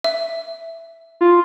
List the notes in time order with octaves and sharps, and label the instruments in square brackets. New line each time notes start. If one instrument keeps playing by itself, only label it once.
[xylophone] E5
[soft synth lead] F4